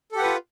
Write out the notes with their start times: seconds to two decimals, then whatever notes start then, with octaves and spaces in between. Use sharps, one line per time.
0.12 A4
0.15 G4
0.18 F#5
0.22 B4
0.25 F4